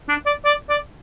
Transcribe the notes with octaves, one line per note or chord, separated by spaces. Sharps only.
D4
D5
D5
D5